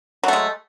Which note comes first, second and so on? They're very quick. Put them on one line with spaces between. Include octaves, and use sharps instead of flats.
F#3 A3 G#3